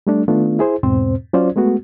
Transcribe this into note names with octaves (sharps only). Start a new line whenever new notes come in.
G3 A3 D4
D#3 A3 B3 D4 F4
E4 G#4 C5
E2 G#2 B2 C4 C5
F#3 C#4 F4 C5 D5
G#3 A3 B3 F#4